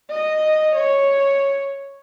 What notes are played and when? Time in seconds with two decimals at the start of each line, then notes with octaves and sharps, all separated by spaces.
0.10 D#5
0.75 C#5